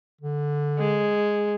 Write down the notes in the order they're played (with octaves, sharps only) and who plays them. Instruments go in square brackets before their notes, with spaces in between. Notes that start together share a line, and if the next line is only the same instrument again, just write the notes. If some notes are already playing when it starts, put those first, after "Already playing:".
[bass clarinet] D3
[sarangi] G#3